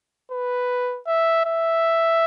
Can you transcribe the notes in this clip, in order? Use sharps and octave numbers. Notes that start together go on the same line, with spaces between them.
B4
E5
E5